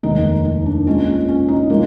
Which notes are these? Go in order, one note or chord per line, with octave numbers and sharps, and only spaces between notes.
F1 D#2 D#3 G#3 D#4
D#4
D4
A#1 A#2 F3 G#3 C#4
C#4
D#4
A2 F3 G#3 A#3